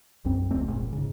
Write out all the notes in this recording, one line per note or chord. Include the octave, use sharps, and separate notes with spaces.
B1 F#2 C4
F1 C#2 A3 C4
F1 A#1 G#2
G#2 C#3